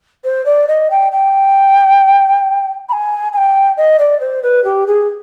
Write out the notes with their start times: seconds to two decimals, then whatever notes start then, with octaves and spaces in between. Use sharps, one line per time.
0.24 C5
0.45 D5
0.68 D#5
0.91 G5
1.12 G5
2.89 B5
2.93 G#5
3.33 G#5
3.37 G5
3.77 D#5
3.99 D5
4.20 C5
4.43 B4
4.64 G4
4.87 G#4